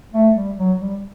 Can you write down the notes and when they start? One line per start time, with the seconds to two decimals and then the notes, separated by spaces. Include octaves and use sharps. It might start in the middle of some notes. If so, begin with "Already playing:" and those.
0.14 A3
0.36 G3
0.57 F#3
0.80 G3